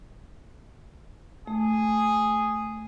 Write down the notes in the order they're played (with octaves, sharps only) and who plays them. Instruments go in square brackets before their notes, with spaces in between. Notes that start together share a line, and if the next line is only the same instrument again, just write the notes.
[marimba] A3 [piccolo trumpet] G#4